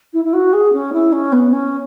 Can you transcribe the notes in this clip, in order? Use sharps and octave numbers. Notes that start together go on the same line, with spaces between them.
E4
E4
F#4
G#4
C#4
E4
C#4
B3
C#4